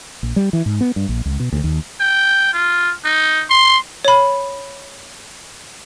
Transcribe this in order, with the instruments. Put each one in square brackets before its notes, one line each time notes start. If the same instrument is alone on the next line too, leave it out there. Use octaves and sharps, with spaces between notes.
[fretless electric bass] A#1
G3
E3
G#2
B3
G2
A#1
C#2
B2
D2
D#2
[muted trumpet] G5
F4
D#4
C6
[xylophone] C#5 B5